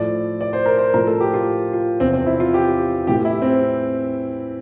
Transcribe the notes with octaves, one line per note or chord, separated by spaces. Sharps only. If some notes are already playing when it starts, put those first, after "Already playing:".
Already playing: A2 F3 D5
D5
C5
A#4
C5
A2 F3 A#4
A4
G4
F4
F4
E2 C3 F3 C4
C4
E4
F4
G4
A2 E3 G4
E4
C4